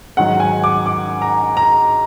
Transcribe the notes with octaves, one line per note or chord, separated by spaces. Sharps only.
G#2 D#3 F#3 F#5
G#5
D6
D6
A#5
A#5